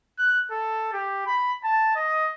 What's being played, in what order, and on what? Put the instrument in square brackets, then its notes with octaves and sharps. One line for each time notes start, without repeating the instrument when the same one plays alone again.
[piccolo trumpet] F#6
A4
G4
B5
A5
D#5